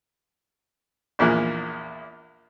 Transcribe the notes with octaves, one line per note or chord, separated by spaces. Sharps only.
A#1 E2 A#2 A#3 G#4 F#6